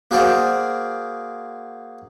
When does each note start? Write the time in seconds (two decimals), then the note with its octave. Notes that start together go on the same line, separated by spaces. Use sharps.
0.11 A#3 F#4 G#4 A#4 C5 D5